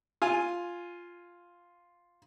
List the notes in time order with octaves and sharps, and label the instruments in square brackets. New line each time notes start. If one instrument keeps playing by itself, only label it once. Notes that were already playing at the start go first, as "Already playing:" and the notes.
[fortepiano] F4 G#5